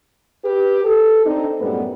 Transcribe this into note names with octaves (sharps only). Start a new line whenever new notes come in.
G4 B4
A4
C4 D4 D#4
F#2 A2 G3 G#3 B3